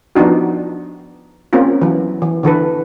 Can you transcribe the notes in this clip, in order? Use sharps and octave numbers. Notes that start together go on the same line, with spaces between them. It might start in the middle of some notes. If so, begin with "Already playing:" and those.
F3 B3 D4 D#4 F#4
A#3 C4 C#4 F4
E3 F#3
E3
D3 E3 A4 B4